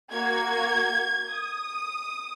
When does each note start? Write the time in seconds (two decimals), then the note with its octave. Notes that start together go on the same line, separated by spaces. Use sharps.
0.11 A#3 F#4 G#6
1.29 D#6